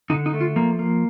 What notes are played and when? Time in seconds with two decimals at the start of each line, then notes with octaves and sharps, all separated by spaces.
0.10 D3 D#4
0.26 D#4
0.33 A3
0.41 F4
0.56 F3 A#3
0.79 A#3